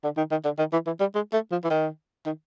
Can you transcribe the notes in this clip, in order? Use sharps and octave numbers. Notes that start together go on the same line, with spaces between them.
D3
D#3
D#3
D3
D#3
E3
E3
G3
G#3
A3
F3
E3
D#3
D#3